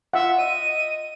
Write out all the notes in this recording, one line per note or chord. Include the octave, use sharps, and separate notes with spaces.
F4 E5 F#5
D#5 D#7